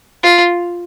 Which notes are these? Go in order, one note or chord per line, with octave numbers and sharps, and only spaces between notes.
F4